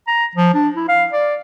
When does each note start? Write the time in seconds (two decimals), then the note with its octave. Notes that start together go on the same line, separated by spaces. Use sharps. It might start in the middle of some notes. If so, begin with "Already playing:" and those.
0.08 A#5
0.35 F3
0.54 D4
0.76 E4
0.89 F5
1.13 D5